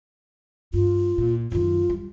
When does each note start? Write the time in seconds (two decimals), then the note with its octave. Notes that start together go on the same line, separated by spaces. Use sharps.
0.74 G2 F4
1.18 A#2
1.52 F#2 D#3 F4
1.90 G3